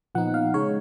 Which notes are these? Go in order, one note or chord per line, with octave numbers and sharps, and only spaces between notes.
A#2 F3 B3 D#4 F#5
F5
C#3 G#3 D#4 C#5